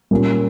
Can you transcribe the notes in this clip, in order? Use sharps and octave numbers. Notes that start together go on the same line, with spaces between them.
A#2 G3 A#3 C#4